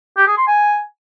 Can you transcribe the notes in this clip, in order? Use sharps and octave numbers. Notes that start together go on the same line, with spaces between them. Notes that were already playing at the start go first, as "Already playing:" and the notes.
G4
G#4
C6
G#5